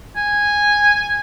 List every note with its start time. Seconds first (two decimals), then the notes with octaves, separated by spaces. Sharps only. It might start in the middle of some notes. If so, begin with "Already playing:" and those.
0.16 G#5